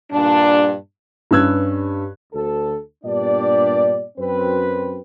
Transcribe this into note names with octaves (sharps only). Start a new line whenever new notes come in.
G2 A#2 G3 D4
G2 C#4 B4 E6 F#6 G#6
D2 A4
G2 A#2 B3 D4 G4 D5
F#2 C4 B4